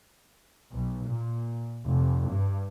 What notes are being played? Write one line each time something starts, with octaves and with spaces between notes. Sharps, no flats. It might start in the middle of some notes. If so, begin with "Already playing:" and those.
B1
A#2
F1
G2